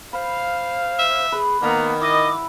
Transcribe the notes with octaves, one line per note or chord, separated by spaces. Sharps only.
C5 F5 B5
E5
G#4 B4
D#3 A#3 B3 F#5 A#5
E4 D#5 D6